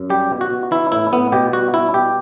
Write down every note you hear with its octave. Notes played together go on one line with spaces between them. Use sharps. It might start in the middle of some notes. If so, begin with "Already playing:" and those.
Already playing: F#2
G3 G4
B2
F#4
B2
E3 E4
A2 E4
A2 B3
B2 G4
G3 F#4
G3 E4
B2 G4